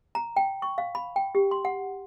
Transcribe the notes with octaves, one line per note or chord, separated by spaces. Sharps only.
A#5
G5
C#6
F5
B5
G5
G4
C6
F#5